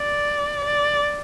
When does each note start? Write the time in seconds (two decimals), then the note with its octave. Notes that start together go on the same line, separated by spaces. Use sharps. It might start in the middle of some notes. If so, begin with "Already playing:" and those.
Already playing: D5
0.65 D5